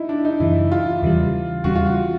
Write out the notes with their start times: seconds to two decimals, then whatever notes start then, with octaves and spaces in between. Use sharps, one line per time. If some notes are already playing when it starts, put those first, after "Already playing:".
Already playing: D#4 E4
0.09 D4
0.25 D#4
0.40 F#2 C#3 E3 E4
0.72 F4
1.02 E2 C#3 E3 G3
1.64 E2 C#3 E3 G3 F#4
1.76 F4
1.86 F#4